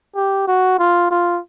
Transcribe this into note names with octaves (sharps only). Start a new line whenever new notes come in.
G4
F#4
F4
F4